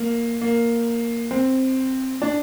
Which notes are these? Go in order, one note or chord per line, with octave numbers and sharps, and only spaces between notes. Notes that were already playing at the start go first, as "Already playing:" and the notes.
Already playing: A#3
A#3
C4
D4